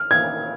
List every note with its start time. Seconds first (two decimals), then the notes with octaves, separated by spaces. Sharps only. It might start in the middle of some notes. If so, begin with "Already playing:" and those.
Already playing: F6
0.11 G#6